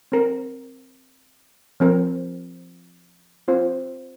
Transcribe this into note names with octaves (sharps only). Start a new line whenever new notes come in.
C4 A#4
F3 C4 A#4
C4 F4 C5